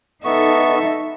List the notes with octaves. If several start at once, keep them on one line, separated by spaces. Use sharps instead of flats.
B3 D#4 A4 E5 C#6